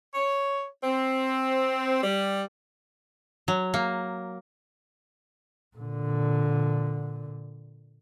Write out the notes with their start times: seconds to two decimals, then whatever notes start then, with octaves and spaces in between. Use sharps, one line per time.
0.15 C#5
0.83 C4
2.03 G3
3.48 F#3
3.74 A#3
5.77 A#2 D3